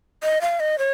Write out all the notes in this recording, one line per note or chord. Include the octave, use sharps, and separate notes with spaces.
D#5
F5
D#5
C#5